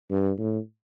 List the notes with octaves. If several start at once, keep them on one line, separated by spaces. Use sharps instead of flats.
G2
A2